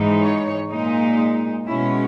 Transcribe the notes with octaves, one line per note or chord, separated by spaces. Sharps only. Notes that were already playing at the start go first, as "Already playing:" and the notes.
Already playing: G#2 E3 G#3 D#4
C#5
A#2 G#3 D#4
B2 G#3 C#4 E4